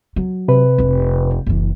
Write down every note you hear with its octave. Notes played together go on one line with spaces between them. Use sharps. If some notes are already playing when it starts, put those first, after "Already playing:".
F#3
C3 B4
F1 D4
F#1 E3